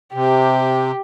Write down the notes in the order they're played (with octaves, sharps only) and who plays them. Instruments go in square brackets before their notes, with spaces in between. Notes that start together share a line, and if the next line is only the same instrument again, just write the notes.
[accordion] C3 [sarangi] G4